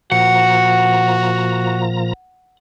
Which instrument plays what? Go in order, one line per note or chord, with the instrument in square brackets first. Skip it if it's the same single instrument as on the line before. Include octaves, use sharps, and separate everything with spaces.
[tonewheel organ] A#2 F3 A#5 [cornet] F#4 [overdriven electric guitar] F#5